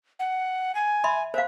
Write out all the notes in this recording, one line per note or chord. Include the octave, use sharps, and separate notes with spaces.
F#5
G#5
E5 B5 C6
C5 E5 F5